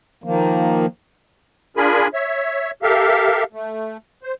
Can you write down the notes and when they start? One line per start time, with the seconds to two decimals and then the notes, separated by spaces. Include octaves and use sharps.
0.24 D#3 F3 A#3
1.77 D4 F4 G#4 A#4 G#5 B5
2.14 C#5 E5
2.83 G4 A4 A#4 E5 F5
3.53 A3
4.23 C5